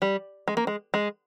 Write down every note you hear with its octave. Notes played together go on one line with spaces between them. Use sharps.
G3
G#3
A#3
G#3
G#3